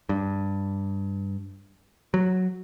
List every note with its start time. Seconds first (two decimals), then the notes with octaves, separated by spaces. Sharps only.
0.09 G2
2.14 F#3